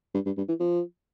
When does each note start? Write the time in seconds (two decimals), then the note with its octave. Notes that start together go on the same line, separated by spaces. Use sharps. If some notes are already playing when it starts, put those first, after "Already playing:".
0.14 G2
0.26 G2
0.37 G2
0.49 E3
0.60 F3